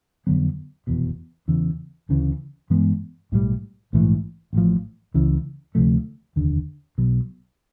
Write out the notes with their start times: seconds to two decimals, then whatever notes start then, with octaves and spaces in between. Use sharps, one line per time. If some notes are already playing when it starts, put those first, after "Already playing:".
0.27 F2 D3 F#3 B3
0.87 F1 E2 B2
1.48 E2 C#3 E3
2.09 D2 C#3 E3
2.70 G2 E3 G#3 B3
3.32 B1 A2 E3 G3
3.93 A#1 G#2 E3 A3
4.53 A1 A2 F3
5.14 C#2 C#3 E3
5.75 D2 C3 F3 A3
6.36 F1 D#2 D3
6.98 B1 B2 F#3